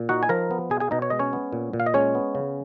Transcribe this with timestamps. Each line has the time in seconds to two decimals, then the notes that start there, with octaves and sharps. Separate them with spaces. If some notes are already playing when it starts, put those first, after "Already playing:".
Already playing: A#2
0.09 D#4 F#4 F#5
0.23 G#5
0.29 F3 A#4 A#5
0.51 B3
0.70 B2 G#4 G#5
0.80 G#4 G#5
0.91 B2 D#4 D#5
1.02 C#5
1.10 G#3 D#5
1.19 C#4 C#5
1.33 B3
1.53 A#2
1.73 A#2
1.80 F5
1.86 D#5
1.94 G#3 C#4 C#5
2.15 B3
2.35 C#3